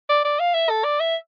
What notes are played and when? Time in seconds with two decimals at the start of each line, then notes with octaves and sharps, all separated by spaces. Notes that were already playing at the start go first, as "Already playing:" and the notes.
0.09 D5
0.24 D5
0.39 F5
0.54 E5
0.70 A4
0.84 D5
1.00 E5